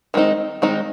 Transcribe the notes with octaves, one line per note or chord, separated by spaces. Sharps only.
D#3 G#3 C4 D#4
D#3 G#3 C4 D#4